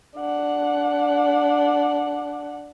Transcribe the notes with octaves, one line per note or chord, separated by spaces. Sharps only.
D4 F#5